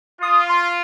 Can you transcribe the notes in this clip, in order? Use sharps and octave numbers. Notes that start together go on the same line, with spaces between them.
F4 D#6
C6